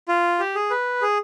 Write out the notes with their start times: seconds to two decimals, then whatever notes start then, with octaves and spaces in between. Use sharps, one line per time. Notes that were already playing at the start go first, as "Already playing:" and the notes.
0.09 F4
0.39 G4
0.56 G#4
0.71 B4
1.02 G#4